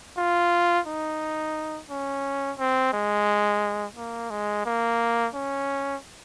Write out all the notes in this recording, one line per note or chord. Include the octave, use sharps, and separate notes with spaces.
F4
D#4
C#4
C4
G#3
A#3
G#3
A#3
C#4